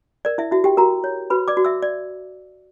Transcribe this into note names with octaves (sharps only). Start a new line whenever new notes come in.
A#4 D5
E4 E5
E4 F#4 E5
G4 G5
F#4 A#4 A#5
C#5
F#4 B4 B5
D5 D6
F#4
E5 E6
D5